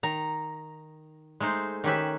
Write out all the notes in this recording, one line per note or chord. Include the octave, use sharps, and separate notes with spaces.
D#3 A#5
G#3 A3 D#4 C5
D#3 C#4 G4 B4 E5